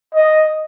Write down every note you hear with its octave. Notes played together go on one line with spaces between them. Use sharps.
D#5